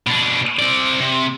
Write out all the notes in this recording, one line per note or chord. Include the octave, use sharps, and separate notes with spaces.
B2 D4
C4 D5
C3